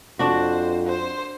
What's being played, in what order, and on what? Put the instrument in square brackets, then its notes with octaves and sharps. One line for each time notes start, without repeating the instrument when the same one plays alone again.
[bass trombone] F2 [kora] D4 F#4 [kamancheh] C5
[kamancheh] C5